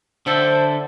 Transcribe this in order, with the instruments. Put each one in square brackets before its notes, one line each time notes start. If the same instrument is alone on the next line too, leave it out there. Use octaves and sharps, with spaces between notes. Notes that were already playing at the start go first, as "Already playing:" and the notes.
[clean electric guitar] D3 E4 A4 [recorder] C5